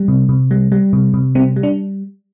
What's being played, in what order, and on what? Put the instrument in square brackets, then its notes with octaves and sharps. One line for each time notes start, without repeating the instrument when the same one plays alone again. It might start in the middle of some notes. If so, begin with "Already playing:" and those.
Already playing: [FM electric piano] G3
C3
C3
G3
G3
C3
C3
G3 C4
G3
D4